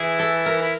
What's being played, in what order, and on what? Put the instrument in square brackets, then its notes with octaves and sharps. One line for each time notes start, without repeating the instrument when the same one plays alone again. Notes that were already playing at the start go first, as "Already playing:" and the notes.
Already playing: [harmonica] E3 E4 [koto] G#4
[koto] A4
A#4
[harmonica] E4